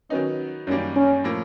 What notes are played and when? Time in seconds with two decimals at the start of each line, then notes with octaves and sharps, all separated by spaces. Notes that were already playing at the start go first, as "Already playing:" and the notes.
0.10 D#3 F#3 B3 C#4 D#4
0.67 F#2 D#3 G3 A#3 C#4
0.96 C#4
1.24 A2 F3 A#3